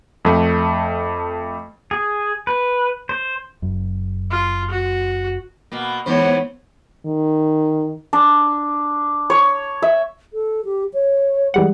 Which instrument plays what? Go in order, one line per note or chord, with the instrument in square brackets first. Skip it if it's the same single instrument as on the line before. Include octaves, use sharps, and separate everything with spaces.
[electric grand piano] F2 A3
[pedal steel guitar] G#4
B4
C5
[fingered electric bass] F#1 F#2
[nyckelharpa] F4
F#4
[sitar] B2 A#3
[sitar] G#2 E3 C5 [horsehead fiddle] B3 C#5
[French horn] D#3
[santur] D4
C#5
E5
[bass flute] A4
G4
C#5
[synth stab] E3 G3 F#5 [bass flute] G#3